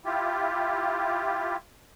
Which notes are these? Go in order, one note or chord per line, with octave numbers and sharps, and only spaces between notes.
E4 F4 G4